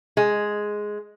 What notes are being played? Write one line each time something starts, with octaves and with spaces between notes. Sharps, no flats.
G#3